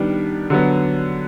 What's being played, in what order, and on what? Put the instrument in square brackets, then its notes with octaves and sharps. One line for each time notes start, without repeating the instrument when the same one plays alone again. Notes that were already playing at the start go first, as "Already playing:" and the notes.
Already playing: [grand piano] D#3 G3 B3 D4
D3 F#3 B3